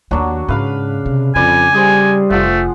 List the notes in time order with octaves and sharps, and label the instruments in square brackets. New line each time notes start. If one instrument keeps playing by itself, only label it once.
[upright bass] D#2 A#3 [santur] F#3 D4 F#4
[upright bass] G#2 [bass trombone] C#3 [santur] B4 F5 B5
[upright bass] C3
[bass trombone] F2 [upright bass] C#3 [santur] B4 D5 [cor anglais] G#5
[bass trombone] G3 [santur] G#4 C5
[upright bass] F1 [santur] F3 F#5 [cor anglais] A3